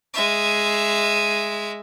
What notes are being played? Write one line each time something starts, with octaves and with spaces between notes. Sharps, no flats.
G#3 E5